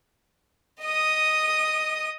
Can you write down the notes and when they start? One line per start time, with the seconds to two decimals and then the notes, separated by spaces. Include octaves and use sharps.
0.81 D#5 D#6